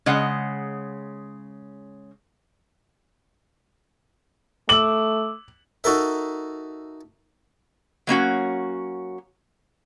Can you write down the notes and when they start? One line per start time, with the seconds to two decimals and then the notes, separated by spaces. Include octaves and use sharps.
0.06 C#3 G#3 D#5 F#5
4.69 A3 D6 E6 F#7
5.84 D#4 F#4 A4 A#4 E5
8.07 F#3 A#3 C#4 F#4